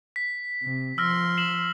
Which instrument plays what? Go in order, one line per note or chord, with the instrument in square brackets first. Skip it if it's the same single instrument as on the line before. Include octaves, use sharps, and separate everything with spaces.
[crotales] B6
[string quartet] C3
[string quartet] F3 C6 [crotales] E6 F6 A#6
[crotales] C7 E7 F#7